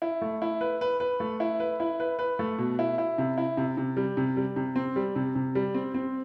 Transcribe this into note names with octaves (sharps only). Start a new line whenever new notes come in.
E4
A3
E4
B4
B4
B4
A3
E4
B4
E4
B4
B4
A3
B2
E4
E4
C3
E4
C3
C3
G3
C3
G3
C3
C4
G3
C3
C3
G3
C4
C4